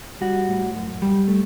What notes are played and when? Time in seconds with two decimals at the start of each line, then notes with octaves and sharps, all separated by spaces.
0.21 G3 F#4
0.48 A2
0.75 F#2
1.02 G3
1.28 A3